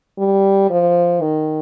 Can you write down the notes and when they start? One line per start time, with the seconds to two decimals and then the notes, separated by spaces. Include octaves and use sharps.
0.18 G3
0.70 F3
1.21 D#3